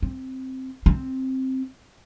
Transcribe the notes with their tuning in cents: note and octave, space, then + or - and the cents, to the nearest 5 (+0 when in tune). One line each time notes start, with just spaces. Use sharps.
C4 +0
C4 +5